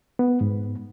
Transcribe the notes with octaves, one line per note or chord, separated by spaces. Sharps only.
B3
G#2